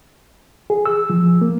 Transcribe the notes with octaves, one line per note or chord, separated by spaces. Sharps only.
G#4
E6
F3
A#3